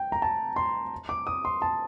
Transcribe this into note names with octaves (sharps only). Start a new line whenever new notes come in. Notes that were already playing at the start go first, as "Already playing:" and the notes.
Already playing: G5
A#5
A5
C6
D6
D#6
C6
A5